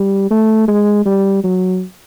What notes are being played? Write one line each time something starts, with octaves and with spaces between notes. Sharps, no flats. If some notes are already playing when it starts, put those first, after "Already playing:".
Already playing: G3
A3
G#3
G3
F#3